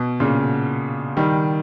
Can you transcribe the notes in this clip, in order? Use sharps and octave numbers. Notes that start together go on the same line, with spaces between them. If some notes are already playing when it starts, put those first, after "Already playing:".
Already playing: B2
A#2 C#3
D#3 G3